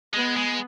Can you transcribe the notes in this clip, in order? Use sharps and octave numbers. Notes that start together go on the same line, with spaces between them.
G#3 B3
G#3